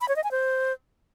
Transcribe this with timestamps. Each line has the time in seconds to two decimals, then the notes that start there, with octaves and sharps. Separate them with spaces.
0.01 B5
0.08 C#5
0.16 D#5
0.24 G#5
0.31 C5